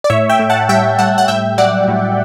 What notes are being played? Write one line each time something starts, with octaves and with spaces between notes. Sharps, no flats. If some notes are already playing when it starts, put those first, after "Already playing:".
D5
A2 C#5 E5
E5 G5
A2
F#5 A5
G3 E5 G5
G3 F#5 A5
F#5
A2 E5 G5
F#3 D5 F#5
A2